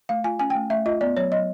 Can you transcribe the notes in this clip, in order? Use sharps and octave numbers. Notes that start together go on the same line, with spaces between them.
A3 F5
F4 G#5
C#4 G#5
G5
A3
A3 E5
F4 D#5
B3 D5
F#3 C#5
F#3 D#5